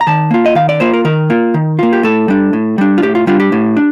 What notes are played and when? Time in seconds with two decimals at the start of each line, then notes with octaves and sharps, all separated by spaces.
0.01 A#5
0.07 D#3 A5
0.31 A#3 F4
0.46 D#5
0.55 D#3 F5
0.69 D5
0.80 A#3 F4 C5
0.93 A#4
1.05 D#3 A#4
1.30 A#3 F4
1.54 D#3
1.79 A#3 F4
1.93 G4
2.03 A2 A4
2.28 G3 D4
2.53 A2
2.78 G3 D4
2.98 F4
3.02 A2 G4
3.15 F4
3.27 G3 D4 F4
3.40 G4
3.52 A2
3.77 D4